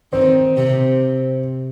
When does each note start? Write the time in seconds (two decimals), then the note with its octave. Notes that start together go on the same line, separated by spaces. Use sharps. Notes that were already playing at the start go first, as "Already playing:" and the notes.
0.13 D#3 C4
0.57 C3